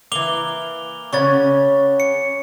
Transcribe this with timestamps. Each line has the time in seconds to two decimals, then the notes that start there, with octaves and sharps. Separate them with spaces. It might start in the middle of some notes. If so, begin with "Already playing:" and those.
0.12 E3 A#3 D6 F7 G7
1.13 C#3 C#4 F#5 C#6 A6
2.00 C#7